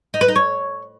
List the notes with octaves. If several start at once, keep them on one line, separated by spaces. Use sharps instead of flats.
D#4
B4
D#4
C#5